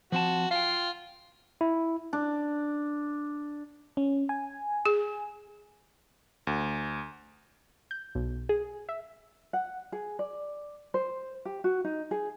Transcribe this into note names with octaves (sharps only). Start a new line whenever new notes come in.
F3 C4 F#4 A5
F4 F5 G5
E4
D4
C#4
G#5
G#4
D2
G6
B1
G#4
E5
F#5
G#4
D5
C5
G4
F#4
D#4
G#4